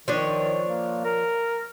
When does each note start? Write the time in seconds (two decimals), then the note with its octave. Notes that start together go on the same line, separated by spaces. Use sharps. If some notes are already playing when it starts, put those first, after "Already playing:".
0.08 D#3 F3 D4 C#5
0.67 A#3
1.05 A#4